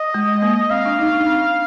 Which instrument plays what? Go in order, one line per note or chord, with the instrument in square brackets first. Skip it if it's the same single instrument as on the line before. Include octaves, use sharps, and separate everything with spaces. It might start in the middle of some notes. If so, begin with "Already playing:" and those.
Already playing: [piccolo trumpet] D#5
[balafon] G#3
A#3
[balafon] C4 [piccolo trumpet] F5
[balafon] D4
D#4
D4
C4